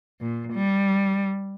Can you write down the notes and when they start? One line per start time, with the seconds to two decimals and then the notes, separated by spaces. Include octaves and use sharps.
0.20 A#2
0.53 G3